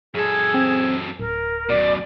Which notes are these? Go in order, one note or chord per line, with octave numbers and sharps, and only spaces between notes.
F#2 G#4 A4
C4
D1 A#4
F#2 B2 D5